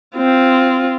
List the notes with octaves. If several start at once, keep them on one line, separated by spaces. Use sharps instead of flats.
C4 F4